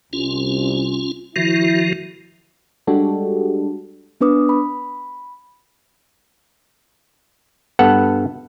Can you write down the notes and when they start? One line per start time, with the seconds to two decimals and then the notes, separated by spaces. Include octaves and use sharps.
0.13 C2 C#4 F4
1.36 D#3 F3 E4 F#4
2.87 G3 G#3 D4 F#4 G4 A4
4.21 B3 D4 B4 D6 D#6
4.49 B5
7.79 G2 B3 A4 F#5